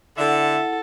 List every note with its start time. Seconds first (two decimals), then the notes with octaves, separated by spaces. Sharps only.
0.18 D3 E4 A4 E5 F#5